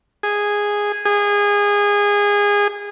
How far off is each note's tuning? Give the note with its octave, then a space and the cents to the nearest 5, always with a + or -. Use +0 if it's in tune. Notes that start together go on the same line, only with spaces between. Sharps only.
G#4 -10
G#4 -25